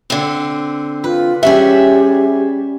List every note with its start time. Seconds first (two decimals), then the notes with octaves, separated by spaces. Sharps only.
0.10 D3 C4
1.04 F4 B4
1.43 G3 C#4 G4 G#4 E5 F#5